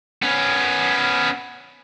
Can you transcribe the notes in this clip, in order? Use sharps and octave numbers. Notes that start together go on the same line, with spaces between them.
B3 C#4